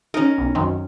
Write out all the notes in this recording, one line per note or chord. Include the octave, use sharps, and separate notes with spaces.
C#4 D#4 A#4
B1
F#2 D#3 C4